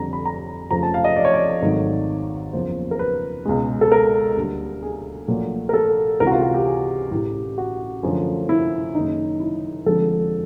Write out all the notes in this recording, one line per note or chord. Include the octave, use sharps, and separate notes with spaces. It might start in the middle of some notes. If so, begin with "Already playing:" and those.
Already playing: F2 D3 G3 A#5
B5
A#5
F1 F2 C#3 F3 A3 A#5
A5
F5
D#5
D5
C#5
D5
G#1 G#2 D#3 F#3 A3
F#1 E2 C#3 F3 A#3 C5
A#4
B4
C#2 B2 G#3
A4
A#4
D2 D3 G3 A#3
G#4
A#1 A#2 F#3 A3
A#4
A4
C#2 C3 E3 A#4
F#4
F4
F#4
G4
G#4
A1 A2 E3 G4
F#4
F#2 D3 F3 A3
E4
F#1 F#2 D#3 D#4
E4
F1 F2 D3 F3 G#3 A4